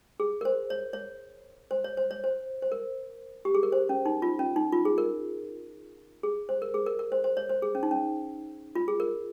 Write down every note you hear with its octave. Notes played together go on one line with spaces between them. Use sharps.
G#4
A#4
C5
C#5
C#5
C5
C#5
C5
C#5
C5
C5
A#4
G4
G#4
A#4
C5
C#4
D#4
F4
C#4
D#4
F4
G#4
A#4
G#4
C5
A#4
G#4
A#4
A#4
C5
C5
C#5
C5
G#4
C#4
D#4
C#4
F4
G#4
A#4